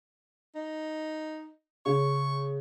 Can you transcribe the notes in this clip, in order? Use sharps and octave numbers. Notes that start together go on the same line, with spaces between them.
D#4
C#3 C#6